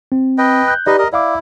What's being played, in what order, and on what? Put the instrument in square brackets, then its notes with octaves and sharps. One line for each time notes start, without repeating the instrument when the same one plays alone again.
[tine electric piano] C4
[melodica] B4 D#5 G5
[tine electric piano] F#6 G6
[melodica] D#4 B4 D#5 [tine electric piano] G4 D5
[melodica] A#4 D#5
[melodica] E4 [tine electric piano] D5 F5 D6